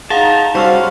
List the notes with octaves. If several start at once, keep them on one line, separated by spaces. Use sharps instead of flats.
D#4 G#4 F5 F#5 A5 A#5
G3 C#4 F#4 C5 F5 C#6 E6 F6